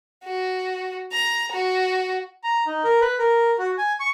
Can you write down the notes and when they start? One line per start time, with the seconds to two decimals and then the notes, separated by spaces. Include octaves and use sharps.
0.24 F#4
1.12 A#5
1.52 F#4
2.44 A#5
2.67 D#4
2.84 A#4
3.01 B4
3.19 A#4
3.59 F#4
3.78 G#5
4.00 C#6